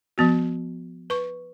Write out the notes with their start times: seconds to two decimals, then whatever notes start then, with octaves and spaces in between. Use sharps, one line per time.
0.18 F3 B3 F#4
1.10 B4 C#6